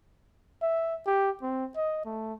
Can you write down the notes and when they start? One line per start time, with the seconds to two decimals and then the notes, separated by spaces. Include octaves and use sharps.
0.62 E5
1.06 G4
1.42 C4
1.76 D#5
2.05 A3